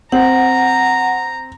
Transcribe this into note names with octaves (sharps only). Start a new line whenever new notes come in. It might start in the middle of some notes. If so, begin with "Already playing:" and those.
C4 F#5 A#5